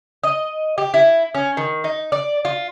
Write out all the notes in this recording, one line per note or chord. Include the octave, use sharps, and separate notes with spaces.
D#5
G4
E4
C#4
D#3
D#4
D5
F4